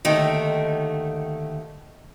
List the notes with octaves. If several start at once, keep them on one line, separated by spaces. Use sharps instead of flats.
D#2 D3 D#3 A3